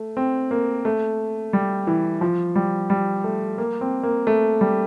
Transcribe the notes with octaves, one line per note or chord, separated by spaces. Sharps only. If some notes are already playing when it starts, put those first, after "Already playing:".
Already playing: A3
C4
A#3
A3
G3
E3
F3
G3
G3
A3
A#3
C4
A#3
A3
G3